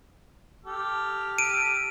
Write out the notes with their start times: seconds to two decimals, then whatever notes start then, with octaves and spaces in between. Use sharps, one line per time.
0.64 G4 A4 F6
1.38 D7 D#7